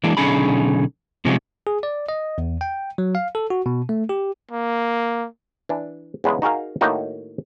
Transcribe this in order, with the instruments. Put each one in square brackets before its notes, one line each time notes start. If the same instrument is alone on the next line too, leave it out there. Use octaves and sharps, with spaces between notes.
[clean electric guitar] E3 G#3 A#3 D4
B1 D3 C#4 D#4 G#4 B5
C3 F3 G#3 C#4
[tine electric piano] G#4
D5
D#5
E2
G5
F#3
F5
A4
F#4
B2
A3
G4
[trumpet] A#3
[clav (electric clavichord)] E3 D4
E2 C#3 G#3 B3
D#4 F#4 G#4 A#4 F5
A2 D#3 A#3 D#4 F#4